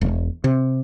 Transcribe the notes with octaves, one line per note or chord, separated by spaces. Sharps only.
E1
C3